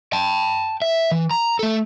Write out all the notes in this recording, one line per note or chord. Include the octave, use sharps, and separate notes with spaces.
G5 A5
E5
E3
A#5
A3 A4